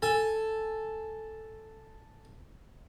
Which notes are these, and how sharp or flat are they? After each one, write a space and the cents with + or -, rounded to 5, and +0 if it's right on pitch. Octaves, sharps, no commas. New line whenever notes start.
A4 +0 G#5 +5